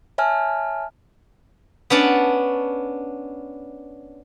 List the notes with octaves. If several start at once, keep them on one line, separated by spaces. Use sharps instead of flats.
C#5 E5 G#5 A5 F6
B3 C#4 D4 A5